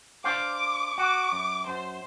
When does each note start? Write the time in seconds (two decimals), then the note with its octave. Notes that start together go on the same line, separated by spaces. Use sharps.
0.24 D4 C5 F5 D6
0.98 F#4 D6
1.32 F#2
1.67 F#2 C5